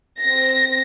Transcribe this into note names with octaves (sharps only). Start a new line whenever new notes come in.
C4 A#6